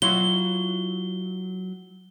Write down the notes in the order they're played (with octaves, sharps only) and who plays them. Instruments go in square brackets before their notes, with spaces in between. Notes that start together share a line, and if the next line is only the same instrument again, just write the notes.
[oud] F#3 E4 F4 [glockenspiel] G7